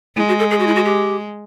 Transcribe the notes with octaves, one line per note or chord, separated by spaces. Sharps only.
G#3 E4
F#4
A4
G#4
F#4
E4
F#4
G4